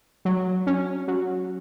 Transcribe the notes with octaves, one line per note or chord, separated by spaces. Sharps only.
F#3
C#4
F#3